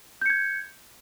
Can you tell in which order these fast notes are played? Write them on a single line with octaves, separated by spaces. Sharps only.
G6 C#7 G#6